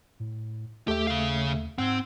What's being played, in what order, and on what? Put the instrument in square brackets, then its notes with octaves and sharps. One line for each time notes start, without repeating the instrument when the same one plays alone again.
[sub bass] A2
[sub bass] D#2 [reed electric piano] A3 E5 [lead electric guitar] G4
[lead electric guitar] C#3 F5
[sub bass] G#2 [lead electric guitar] C4 [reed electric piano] F#5 E6 G#6